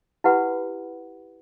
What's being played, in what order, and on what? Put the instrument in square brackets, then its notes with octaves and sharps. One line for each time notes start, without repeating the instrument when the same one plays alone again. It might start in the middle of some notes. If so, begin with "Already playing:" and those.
[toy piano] E4 G4 B4 F#5 B5